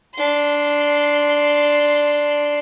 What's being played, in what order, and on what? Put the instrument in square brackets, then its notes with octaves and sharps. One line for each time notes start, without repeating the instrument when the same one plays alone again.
[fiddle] D4 C6